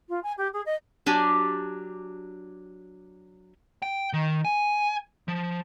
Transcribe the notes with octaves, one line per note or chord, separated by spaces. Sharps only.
F4
G#5
G4
G#4
D#5
F#3 D4 G4 G#5
G5
D#3
G#5
F3